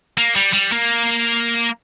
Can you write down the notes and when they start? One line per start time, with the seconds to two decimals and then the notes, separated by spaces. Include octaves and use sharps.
0.18 A#3
0.36 G3
0.53 G3
0.72 A#3